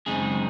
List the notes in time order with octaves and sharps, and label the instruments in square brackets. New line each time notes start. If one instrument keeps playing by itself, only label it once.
[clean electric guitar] F#2 C#3 G#3 C4 D#4 G#4